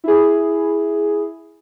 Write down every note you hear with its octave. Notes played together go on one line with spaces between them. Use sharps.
E4 G#4